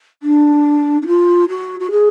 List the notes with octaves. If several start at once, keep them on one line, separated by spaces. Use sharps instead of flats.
D4
D4
F4
F#4
F#4
G#4